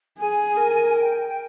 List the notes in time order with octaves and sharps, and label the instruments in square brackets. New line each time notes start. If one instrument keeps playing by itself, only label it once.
[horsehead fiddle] G#4 [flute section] G#5
[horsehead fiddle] A#4
[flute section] G5